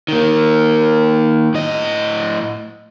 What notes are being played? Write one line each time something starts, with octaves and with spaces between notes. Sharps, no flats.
D#3 A#3
A2 D#5